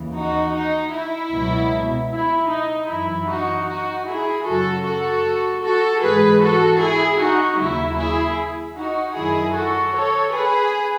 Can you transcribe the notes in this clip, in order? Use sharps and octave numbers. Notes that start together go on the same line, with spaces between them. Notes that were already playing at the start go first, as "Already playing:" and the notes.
Already playing: D#2 C#3 E3
D#4 F#4
D#4
E4
C#2 B2 F#3
E4
D#4
F#2 E3 E4
D#4 F#4
D#4 F#4
E4 G#4
F#2 C#3 F#3 F#4 A4
F#4 A4
F#4 A4
G#2 E3 G#4 B4
F#4 A4
E4 G#4
D#4 F#4
D#2 C#3 F#3 E4
E4 G#4
D#4 F#4
F#2 D#3 F#3 E4 G#4
F#4 A4
A4 C#5
G#4 B4